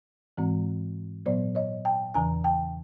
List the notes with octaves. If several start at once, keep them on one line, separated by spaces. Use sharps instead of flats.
G#2 E3 G#3 C4
A#2 F#3 B3 C5 D5
C#5 D#5
G5 A5
E2 C#3 E3 G#5 A#5
G5 A5